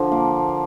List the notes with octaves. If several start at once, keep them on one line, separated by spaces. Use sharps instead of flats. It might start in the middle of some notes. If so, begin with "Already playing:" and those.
Already playing: D3 F3
A#3